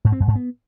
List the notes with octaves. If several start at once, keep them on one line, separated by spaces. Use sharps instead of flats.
G#2
C4
F#2
G#2
B3